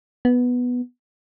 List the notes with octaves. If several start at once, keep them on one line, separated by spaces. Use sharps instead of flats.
B3